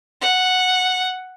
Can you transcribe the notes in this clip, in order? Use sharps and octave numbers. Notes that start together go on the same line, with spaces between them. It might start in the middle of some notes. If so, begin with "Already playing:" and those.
F#5